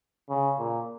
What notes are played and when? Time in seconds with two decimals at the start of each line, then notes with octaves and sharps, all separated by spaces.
0.29 C#3
0.59 A#2